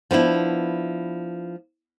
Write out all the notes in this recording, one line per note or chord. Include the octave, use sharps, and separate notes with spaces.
F3 B3 D4 E4